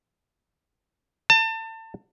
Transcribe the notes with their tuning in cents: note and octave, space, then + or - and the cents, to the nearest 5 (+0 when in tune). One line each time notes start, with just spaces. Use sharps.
A5 +30